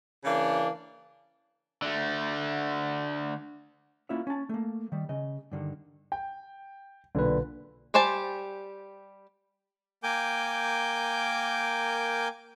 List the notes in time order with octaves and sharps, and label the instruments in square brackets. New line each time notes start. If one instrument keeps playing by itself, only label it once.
[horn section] C#3 E3 A#3 D4
[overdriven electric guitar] D3 A3
[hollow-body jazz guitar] A#3 C#4 E4 F4 C#5 E5
C#4 A5
A3 A#3
D#3 G3
C#3 D#5
G2 D3 D#3
[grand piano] G5
[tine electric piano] B1 B4 [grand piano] A#2 D3
[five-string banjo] G3 G4 C5 G#5 A5
[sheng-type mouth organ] A#3 A#4 G5 G#5 D6 G6